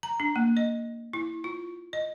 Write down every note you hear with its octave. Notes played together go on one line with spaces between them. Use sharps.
A#5
D4
A#3
D#5
E4
F4
D#5